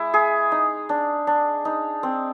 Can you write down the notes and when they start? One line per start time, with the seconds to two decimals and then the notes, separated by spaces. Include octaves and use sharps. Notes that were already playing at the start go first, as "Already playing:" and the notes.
Already playing: G#3 E4
0.14 G#4
0.52 D#4
0.89 D4
1.27 D4
1.65 D#4
2.03 C4